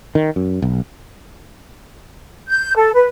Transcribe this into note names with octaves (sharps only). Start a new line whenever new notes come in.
D#3
F#2
B1
G6
A4
B4